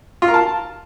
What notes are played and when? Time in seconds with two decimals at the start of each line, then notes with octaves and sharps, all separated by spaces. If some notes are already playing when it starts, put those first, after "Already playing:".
0.22 F4
0.28 A#4
0.34 A5